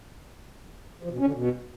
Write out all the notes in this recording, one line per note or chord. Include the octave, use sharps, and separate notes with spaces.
F3
B2
C#4
D3
B2